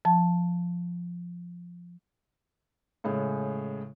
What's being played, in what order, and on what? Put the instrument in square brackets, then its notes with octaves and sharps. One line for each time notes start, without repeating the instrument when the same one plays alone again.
[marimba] F3 A5
[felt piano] A2 C#3 G#3